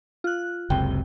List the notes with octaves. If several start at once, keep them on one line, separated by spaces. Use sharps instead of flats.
F4 F#6
F#1 C#2 C3 G5